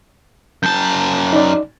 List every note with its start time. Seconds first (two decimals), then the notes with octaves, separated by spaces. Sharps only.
0.63 F#2 A5 G6
1.33 D#4 D5